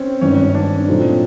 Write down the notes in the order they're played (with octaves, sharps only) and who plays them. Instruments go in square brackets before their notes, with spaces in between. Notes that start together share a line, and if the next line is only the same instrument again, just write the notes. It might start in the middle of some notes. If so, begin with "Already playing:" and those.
Already playing: [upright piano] C4 C#4
[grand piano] G#1 G2 D#3 [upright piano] C#4
[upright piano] D4
[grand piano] A#2 F#3 A3 C4 D#4